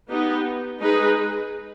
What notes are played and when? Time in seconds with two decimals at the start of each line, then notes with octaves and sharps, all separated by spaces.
0.09 B3 D#4 G4
0.81 G#3 D#4 G#4 B4